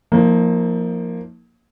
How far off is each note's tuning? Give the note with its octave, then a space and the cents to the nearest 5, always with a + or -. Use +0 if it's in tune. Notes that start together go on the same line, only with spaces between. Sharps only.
F3 +10 A#3 +0 D#4 +45